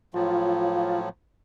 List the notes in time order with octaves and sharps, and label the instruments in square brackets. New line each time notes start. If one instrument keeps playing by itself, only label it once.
[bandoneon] A2 F3 F#3 [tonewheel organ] F4